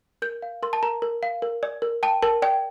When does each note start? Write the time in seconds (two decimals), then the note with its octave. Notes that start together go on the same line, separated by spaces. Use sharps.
0.22 A#4 G6
0.42 F5
0.63 A#4 C6
0.73 A5
0.83 A#4 A#5
1.02 A#4
1.23 F5
1.42 A#4
1.63 D5
1.82 A#4
2.03 G5 A5
2.22 A#4 A5
2.42 D5 G5